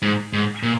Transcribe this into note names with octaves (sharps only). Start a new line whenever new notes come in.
G#2
G#2
A#2